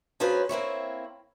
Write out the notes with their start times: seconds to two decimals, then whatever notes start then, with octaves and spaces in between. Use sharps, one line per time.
0.20 F#3 C#4 F4 G#4 B4 C5
0.49 A#3 C4 E4 C#5